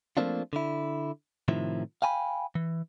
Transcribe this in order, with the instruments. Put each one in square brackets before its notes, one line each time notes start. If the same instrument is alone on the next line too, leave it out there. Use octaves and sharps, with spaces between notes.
[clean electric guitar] F3 A3 A#3 C4 D4 F4
D3 E4
A2 C3 D#3 F3 E4
F5 G5 G#5 A#5 B5
E3